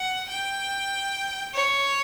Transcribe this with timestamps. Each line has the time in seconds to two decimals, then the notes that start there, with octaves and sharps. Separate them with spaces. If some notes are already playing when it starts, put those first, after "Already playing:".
Already playing: F#5
0.29 G5
1.54 C#5